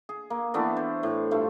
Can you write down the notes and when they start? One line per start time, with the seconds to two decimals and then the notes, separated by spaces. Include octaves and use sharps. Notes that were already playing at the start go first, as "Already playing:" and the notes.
0.09 G#4
0.30 A#3
0.54 E3 A3 B3 D4
0.77 C5
1.03 A2
1.31 G2 A3 F4